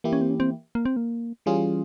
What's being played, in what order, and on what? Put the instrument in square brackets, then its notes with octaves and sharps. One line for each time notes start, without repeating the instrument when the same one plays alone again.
[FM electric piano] E3 A#3 E4 G4
[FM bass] C#4
C4
C#4
C4
A#3
C4
A#3
[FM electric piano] E3 G3 C#4 F4 G#4